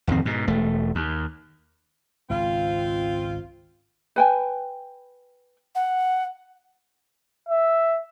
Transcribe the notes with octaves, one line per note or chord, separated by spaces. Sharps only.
D1 F2 D#3 C4
G#2 B2
E1 A3
D#2
G#1 C#2 G#2 C4 F4
B4 G5 G#5
F#5
E5